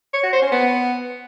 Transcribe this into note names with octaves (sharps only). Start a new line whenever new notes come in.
C#5
F#4
C5
C#4
B3